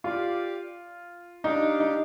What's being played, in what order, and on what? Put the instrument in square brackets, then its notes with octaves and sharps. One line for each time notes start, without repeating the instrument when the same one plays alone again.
[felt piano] F4 [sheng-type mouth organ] G4 D5 F5
[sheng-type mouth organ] D4 G4 D5 F5 [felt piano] D#4
[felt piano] D#4